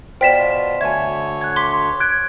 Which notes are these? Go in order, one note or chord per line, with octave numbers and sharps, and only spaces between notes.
B2 F4 C5 D5 G5 B6 E7
D2 D3 C#5 E5 G#5 G#6
F#6 G#6
C6 D6 B6
F#6 G#6 D7